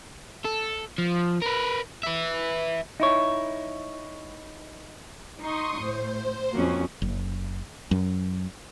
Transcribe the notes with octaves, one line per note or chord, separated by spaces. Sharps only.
A4
F3
A#4 B4
B4 E5
D#4 E4 C#5
D#4 C6 C#6 D#6
A2 C5
F2 A#3 C#4 F#4
F#1
F#2